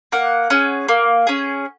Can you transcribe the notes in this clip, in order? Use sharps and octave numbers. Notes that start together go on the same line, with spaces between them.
A#3 F#5
C#4 G#4
A#3
C#4 G#4